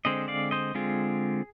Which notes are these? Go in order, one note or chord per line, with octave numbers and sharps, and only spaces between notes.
D3 G#3 C4 C5 D#5
D5 F5
C5 D#5
D3 G#3 C4 F4 G#4